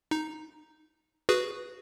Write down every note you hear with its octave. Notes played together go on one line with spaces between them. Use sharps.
D#4
F#4 G#4 B4